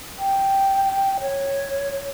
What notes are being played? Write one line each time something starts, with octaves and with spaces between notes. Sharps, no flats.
G5
C#5